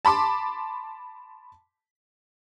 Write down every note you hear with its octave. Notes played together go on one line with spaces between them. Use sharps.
A5 B5 C6 D6